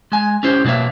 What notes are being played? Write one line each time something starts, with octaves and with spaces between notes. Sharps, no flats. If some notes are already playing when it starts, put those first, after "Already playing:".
G#3 G#5
C#4 E4 G4 C5
B2 F#3 G3 A#3 E5